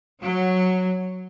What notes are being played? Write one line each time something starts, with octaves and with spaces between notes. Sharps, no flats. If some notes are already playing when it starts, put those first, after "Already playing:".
F#3